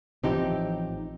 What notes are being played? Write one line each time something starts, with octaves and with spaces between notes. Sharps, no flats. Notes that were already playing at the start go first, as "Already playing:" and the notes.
A1 E3 F3 C4 D#4 G4